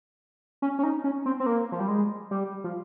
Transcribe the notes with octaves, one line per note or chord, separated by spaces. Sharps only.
C#4
C#4
D#4
C#4
C4
C4
A#3
F3
G3
G#3
G3
F3